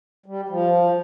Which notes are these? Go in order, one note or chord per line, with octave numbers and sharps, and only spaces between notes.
G3
F3